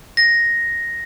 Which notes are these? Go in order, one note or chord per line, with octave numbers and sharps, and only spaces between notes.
A#6